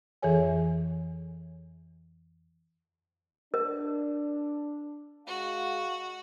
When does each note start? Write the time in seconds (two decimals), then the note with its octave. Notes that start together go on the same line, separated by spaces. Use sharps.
0.22 F2 E3 G#4 A4 C#5 G#5
3.54 D4 A#4
5.27 G#3 F#4 F5 F#5